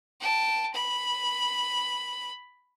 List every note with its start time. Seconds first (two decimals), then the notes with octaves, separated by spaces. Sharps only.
0.20 G5 A5
0.74 B5